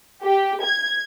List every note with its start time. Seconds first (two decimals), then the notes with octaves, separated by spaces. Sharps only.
0.24 G4
0.64 G#6